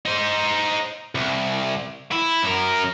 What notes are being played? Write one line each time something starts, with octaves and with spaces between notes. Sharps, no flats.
D#4 C5
C2
E4
F#2 A#4